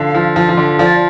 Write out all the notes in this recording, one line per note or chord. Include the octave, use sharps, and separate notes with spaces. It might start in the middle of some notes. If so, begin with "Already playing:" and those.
Already playing: D3 F3 F5
F3
F3
F3
D3
F3 D5